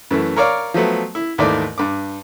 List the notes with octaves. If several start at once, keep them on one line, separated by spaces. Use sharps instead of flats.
F#2 E3 A3
A#4 C#5 D5 F5
F3 F#3 A3 B3
E4
D#2 G#2 E3 A3 D5
G2 D6